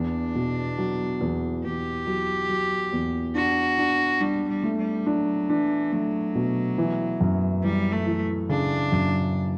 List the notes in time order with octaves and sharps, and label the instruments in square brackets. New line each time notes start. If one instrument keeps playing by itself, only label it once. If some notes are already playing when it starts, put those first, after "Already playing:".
Already playing: [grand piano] E2 [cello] D4
[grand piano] B2
F#3
E2
[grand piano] E2 [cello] G4
[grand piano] F#3
F#3
E2
[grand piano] D4 [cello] F#4
[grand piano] D4
[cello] G3 [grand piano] D4
[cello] G3
[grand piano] A3
[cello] G3
[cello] F#3 [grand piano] D4
[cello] E3 [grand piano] D4
[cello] F#3 [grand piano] A3
[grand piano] B2
E3
F#2
[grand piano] E3 [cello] G3
[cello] A3
[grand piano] E3
[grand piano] C#3 [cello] D4
[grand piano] F#2